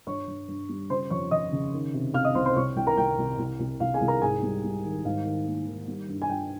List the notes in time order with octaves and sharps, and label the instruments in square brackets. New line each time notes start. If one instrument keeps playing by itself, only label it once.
[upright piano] G2 C#5 C#6
G2
G2
G3
C#3 C5 C6
F2 C#5 C#6
F2 D#5 D#6
C#3
D#3
C3
C3 F5 F6
D#5 D#6
C2 C5 C6
C5 C6
C2 C#5 C#6
C2 G5
A#4 A#5
C2 G5
C2
C2
C2
C2 F5
G#4 G#5
C2
A#4 A#5
G#2 G#4 G#5
G3
G3
D#3
G#2 F5
D#3
A#3
D#3
G3
G2
G#5
G2 G5